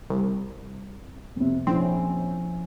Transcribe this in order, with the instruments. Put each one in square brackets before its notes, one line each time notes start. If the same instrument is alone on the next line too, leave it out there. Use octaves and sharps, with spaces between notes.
[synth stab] C2
[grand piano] F2 C3
[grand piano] A#1 [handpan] F3 C#4 E4 [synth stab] C4